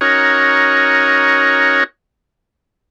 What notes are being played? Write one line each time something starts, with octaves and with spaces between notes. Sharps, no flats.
C#4 D#4 F#4 A#4 C#5